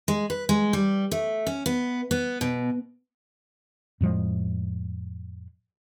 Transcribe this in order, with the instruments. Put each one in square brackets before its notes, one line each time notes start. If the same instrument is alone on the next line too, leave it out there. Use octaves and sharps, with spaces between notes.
[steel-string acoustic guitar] G#3
B4
G#3
G3
A3
C#4
B3
B3
B2
[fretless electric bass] F2 A2 F3 G#3